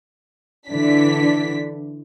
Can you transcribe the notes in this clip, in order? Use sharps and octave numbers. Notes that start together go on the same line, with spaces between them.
D3 E3 D4 B6